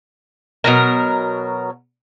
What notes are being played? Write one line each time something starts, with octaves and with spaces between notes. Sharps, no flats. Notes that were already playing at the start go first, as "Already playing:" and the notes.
B2 F#3 A#4